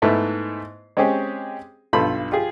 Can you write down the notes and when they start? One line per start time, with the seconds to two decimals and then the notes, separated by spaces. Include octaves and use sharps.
0.02 G#2 A3 B3 E4
0.97 G#3 C4 C#4 G4 G#4
1.93 B1 G2 F4 A4 B5 C6
2.32 F4 G4 G#4